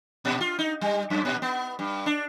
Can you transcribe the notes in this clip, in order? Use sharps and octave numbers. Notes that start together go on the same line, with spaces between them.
A#2
F4
D#4
G3
F#2
A#2
B3
G2
D4